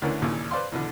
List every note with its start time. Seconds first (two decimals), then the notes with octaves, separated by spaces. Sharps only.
0.02 D2 D3 E3 A3 C#4 A#4
0.22 A#1 D#2 A#2 C#3 E3
0.51 B4 C5 D5 F5 C6
0.72 E2 B2 D3